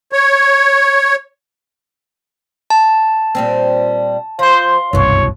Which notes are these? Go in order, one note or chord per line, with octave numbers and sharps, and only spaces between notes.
C#5
A5
A#2 G3 C4
F3 C5 F5 C6
F#1 C2 G2 B2 E3 C#5